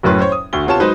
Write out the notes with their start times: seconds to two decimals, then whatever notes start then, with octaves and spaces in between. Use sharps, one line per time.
0.03 F#1 F#2 A2 C#4 B4 C6
0.20 C5 C#5
0.32 D#6
0.53 D2 F#4 G7
0.66 C3 B3 F4 C#5 A5 E7
0.80 F#3 G#3 D#4 B4 C5